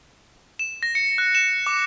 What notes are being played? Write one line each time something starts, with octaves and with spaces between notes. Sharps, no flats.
E7
A#6
C#7
F#6
E7
D6